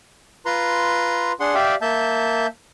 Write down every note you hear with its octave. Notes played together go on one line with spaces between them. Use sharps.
F4 B4 A#5 C6
D4 G#4 F#5 C6
G4 D5 E5 F5 G5
A#3 E5 A5 G6